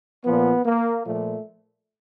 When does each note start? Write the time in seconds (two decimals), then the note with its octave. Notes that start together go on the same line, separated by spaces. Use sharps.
0.23 A#2 F3 B3
0.64 A#3
1.04 A#2 F3 A3